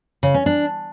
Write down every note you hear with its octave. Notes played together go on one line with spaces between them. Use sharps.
C#3
C#4
D4